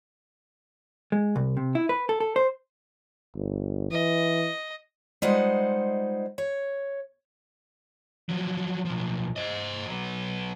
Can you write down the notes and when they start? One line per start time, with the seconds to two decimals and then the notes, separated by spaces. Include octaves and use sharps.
1.12 G#3
1.36 C2
1.57 C3
1.75 E4
1.89 B4
2.09 A4
2.20 A4
2.36 C5
3.35 G1
3.91 E3 D#5
5.22 G3 G#3 D#4 F4 C5 F#5
6.38 C#5
8.29 F3 F#3
8.85 B1 F3
9.36 C5 D#5
9.86 F#3 B3